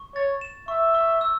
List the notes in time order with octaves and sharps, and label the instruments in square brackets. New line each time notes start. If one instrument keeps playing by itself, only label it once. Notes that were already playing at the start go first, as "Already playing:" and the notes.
Already playing: [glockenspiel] C#6
[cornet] C#5 [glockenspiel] A6
[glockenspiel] E7
[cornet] E5 [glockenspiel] C#6
[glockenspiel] C#6
E6